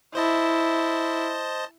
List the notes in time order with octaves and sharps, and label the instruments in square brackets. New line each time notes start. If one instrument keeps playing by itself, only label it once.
[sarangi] E4 [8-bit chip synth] C5 D#5 A5